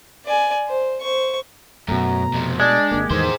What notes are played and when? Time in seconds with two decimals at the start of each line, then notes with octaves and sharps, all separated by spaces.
0.25 D5 G#5
0.68 C5
1.01 C5 C#6
1.88 F#2 B2 A3 A#5
2.34 F2 C3
2.60 G#3 D4 D5
2.91 G#1 A#3 G4
3.11 E2 D#3 B3 G#4 C5